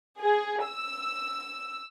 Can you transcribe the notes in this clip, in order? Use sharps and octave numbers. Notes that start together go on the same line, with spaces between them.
G#4
E6